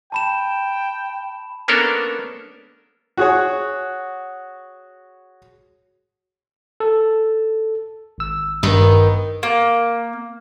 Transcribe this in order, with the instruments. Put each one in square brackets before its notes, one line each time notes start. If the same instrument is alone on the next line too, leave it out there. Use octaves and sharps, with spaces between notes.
[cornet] G5 [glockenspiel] A5 B5 E7
[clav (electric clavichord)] A#3 B3 C#4 D4 A4 A#4
[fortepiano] F#4 G#4 C#5
[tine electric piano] A4
G#1 E6
[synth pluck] G2 [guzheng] D#3 B3 D#4
[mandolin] A#3